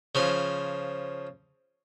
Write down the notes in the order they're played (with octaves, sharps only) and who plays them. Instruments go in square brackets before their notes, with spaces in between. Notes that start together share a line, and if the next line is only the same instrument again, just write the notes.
[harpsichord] C#3 F3 G#5